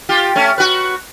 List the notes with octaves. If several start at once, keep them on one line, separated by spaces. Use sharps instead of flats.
F4 G4
A3 C#4
F#4 B4